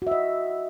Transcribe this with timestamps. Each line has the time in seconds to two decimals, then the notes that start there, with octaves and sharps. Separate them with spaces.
0.02 F#4
0.07 E5
0.11 D#5